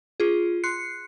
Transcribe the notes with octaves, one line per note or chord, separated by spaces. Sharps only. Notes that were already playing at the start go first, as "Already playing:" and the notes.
F4 G#4
C6 F#6 C7 C#7